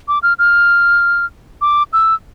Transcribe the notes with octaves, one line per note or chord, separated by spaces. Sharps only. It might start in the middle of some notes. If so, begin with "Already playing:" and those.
D6
F6
F6
D6
E6